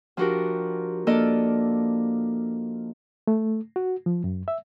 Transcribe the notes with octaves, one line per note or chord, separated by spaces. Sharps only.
F3 D4 F#4 G4 A#4
F3 A#3 D4 A4 D5 D#5
A3
F#4
F3
F#2
E5